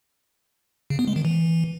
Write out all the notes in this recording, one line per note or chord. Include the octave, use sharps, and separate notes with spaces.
C#3
B3
G#3
D#3
E3